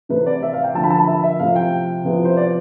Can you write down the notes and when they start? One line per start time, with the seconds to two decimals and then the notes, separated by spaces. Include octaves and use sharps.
0.09 C3 E3 A3 C4 B4
0.26 D5
0.42 E5
0.54 F5
0.64 G5
0.74 D3 F3 A3 D4 A5
0.84 B5
0.90 A5
0.99 B5
1.07 E5
1.23 E5
1.40 C3 F3 A3 E4 F5
1.56 G5
2.04 C3 F3 B3 E4
2.25 C5
2.37 D5